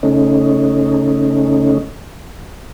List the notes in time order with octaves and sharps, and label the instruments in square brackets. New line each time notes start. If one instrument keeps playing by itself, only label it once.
[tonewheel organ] C#3 A3 C#4 D#4